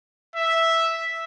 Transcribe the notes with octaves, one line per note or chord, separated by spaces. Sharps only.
E5